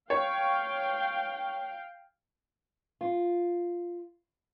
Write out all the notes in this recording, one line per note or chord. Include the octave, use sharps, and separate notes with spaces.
C#5 F5 G5
F4